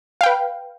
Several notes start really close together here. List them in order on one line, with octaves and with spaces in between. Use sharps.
F5 G5 B4